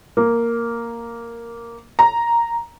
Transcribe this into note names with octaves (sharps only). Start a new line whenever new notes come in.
A#3
A#5